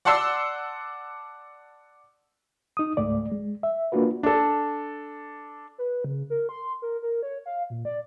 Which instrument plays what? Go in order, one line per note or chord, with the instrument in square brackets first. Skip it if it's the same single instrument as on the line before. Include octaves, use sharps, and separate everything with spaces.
[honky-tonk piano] D5 F#5 A5 C6 E6 C7
[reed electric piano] D#4 D#6
C#2 G#2 A3 D5
G#3
E5
A#3 D4 F4 F#4 B4
[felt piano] D4 A4
[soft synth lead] B4
C#3
A#4
C6
A#4
A#4
C#5
F5
A#2
D5